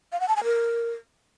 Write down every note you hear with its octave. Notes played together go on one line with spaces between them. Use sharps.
F5
F#5
A5
G#5
A#4